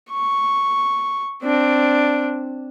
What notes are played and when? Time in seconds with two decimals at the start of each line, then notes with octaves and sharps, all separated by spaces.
0.10 C#6
1.43 C4 D4